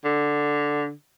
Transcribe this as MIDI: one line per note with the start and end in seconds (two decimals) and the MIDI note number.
0.05 0.91 50